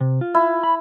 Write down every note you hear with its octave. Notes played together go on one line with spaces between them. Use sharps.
C3
F4
E4
B5